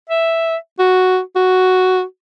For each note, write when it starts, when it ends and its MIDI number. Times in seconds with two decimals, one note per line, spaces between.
0.10 0.57 76
0.79 1.20 66
1.36 2.02 66